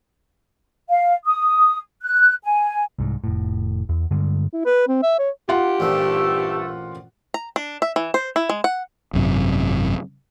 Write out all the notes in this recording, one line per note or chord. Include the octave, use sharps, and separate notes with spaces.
F5
D#6
F#6
G#5
C2 G#2
F1 A2
E2
G2 D3 G#3
E4
B4
C4
E5
C#5
F4 G4 F#5
A1 G2 A#2 A3 C4
A#5
D4
E5
E3
C5
E4
G#3
F#5
G#1 F#2 C3